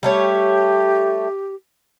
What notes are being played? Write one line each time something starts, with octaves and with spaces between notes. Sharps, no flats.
G3 A3 G4 C#5